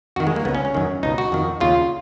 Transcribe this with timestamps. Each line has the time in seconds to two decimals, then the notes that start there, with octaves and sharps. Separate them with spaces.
0.16 F2 D#3 F#4
0.27 G#3
0.36 A#3
0.45 C#2 C#3 B3
0.55 C#4
0.65 C#4
0.75 F#2 D#3
1.03 C#2 B2 D#4
1.18 F#4
1.32 F2 D#3
1.60 D#2 C#3 F4